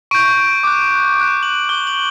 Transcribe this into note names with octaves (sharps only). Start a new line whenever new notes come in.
C#6 G6 D7
D6 F#6
D6 F#6
F#7
D6 F#6 G7
F#7